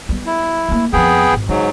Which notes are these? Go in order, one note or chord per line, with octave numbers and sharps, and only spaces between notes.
G3 B3
E4
A3 A#3
F2 F3 B3 G#4 G5
G#1
G#2 C#3 F#3